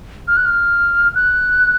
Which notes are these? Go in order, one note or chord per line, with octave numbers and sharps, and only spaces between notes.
F6
F#6
F6
F#6